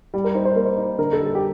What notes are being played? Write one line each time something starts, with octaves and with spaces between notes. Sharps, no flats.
G3
A#4
D#4 C5
C5
A#3 A#4
C5
D#4
D3 A#4
A4
G3
A4
G4